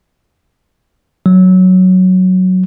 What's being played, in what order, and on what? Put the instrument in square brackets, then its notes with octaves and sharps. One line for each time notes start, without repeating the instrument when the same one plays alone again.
[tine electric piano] F#3